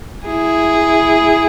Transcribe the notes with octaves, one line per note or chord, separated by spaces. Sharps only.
E4 G#4